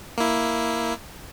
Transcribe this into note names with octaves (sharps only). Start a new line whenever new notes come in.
A#3 E4